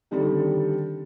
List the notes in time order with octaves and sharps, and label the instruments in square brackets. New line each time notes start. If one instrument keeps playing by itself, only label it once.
[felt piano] D3 D#3 G3 C4 D4 A4